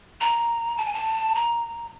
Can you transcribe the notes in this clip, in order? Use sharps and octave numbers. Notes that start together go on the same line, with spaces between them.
A#5
A5
G#5
A5
A#5